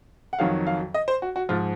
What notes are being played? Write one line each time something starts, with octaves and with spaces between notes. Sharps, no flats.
F#5
F2 D#3 F#3 F5
F5
D#5
C5
F#4
F#4
G#2 F3 F4